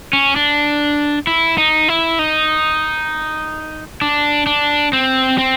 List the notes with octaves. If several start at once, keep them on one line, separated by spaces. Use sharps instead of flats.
C#4
D4
E4
D#4
E4
D#4
D4
D4
C4
C4